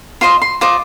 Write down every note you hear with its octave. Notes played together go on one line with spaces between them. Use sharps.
F4 C5 D#5 C6
C6
F4 C5 D#5 D6